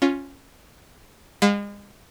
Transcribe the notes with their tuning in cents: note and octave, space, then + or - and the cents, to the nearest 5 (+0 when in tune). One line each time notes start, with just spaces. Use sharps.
C#4 +0 F4 +10
G#3 -35 F5 +40